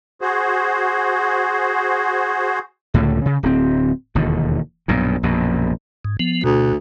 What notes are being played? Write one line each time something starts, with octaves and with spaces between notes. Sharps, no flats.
F#4 G#4 C5
C#2 A2 D3
C#3
D1 C4
E1 D#2 D3
B1 G2 A#2
A#1 F#2 B2
G#2
F3 B3
D2 B2